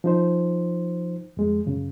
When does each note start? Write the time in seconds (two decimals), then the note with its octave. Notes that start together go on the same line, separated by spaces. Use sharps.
0.04 F3 D#4 C5
1.37 F2 G#3
1.66 F#2 C#3